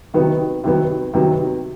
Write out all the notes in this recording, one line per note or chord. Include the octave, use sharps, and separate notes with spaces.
C3 D#3 F#3 B3
C3 D#3 F#3 B3
C3 D#3 F#3 B3